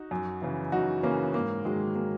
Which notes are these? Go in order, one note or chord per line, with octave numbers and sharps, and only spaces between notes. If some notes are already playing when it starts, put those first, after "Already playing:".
Already playing: D#4 F#4
F#2
C#3 E3
F#2 D#4 F#4
C#3 E3 A#3 C#4
G#2 A#3
D#3 F#3 G#3
A#3